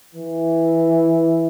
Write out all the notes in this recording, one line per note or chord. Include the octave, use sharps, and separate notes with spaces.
E3